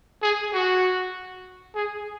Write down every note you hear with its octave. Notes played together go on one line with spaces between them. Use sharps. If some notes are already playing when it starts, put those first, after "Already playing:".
G#4
F#4
G#4